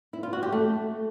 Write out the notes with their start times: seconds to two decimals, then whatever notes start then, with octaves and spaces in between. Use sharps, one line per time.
0.13 E4
0.23 F4
0.33 F#4
0.43 G4
0.52 A3